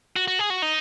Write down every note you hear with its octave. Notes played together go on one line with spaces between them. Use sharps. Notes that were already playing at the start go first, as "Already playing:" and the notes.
F#4
F#4
G#4
F#4
D#4